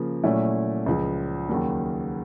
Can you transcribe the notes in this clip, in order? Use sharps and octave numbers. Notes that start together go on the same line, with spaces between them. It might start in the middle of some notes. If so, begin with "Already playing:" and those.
Already playing: C#3 F3 A#3
A#2 F#3 A3 C#4 E4
C#2 C#3 F3
D#2 C#3 F#3 A#3